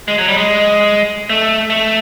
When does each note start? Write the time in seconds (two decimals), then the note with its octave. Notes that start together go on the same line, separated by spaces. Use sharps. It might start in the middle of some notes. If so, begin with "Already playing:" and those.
0.08 G#3
0.18 F#3
0.28 G3
0.38 G#3
1.29 A3
1.70 A3